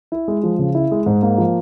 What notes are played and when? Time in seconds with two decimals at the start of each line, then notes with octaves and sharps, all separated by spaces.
0.12 E4
0.28 G#3
0.43 F3
0.59 C#3
0.75 E4
0.91 G#3
1.06 G#2
1.22 A#3
1.38 F3